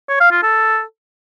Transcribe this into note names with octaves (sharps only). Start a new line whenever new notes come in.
C#5
F5
F4
A4